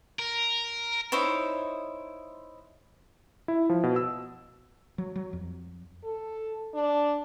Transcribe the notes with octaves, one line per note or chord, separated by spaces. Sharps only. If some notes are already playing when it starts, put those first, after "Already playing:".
A#4
D#4 E4 C5 C#5
E4
F3
B2
E6
F#3
F#3
F2
A4
D4